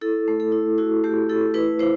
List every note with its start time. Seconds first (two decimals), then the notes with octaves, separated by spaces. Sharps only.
0.01 E4 A4
0.28 A3
0.40 A4
0.52 E4
0.78 E4 F#4
1.04 A3 G4
1.29 E4 A4
1.54 E4 B4
1.79 E4 C5